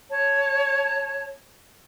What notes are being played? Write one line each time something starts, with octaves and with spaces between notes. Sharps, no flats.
C#5 A5